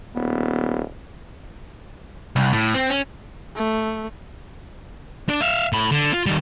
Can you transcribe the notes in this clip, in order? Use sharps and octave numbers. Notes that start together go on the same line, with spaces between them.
D#1 B3
C2
A2
C4
C#4
A3
D4
E5 F5
A2 B5
D3
F4
D#3 G3